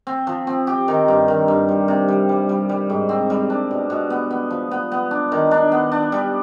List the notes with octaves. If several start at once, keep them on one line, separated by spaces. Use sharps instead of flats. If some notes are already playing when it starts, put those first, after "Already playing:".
C4
F3
C4
G4
D#3
G2
D#3
G2
G3
C3
G3
G3
G3
G3
G#2
C4
G3
D4
B2
B2
B3
B3
F3
B3
B3
D4
D#3
D4
B3
D4
G3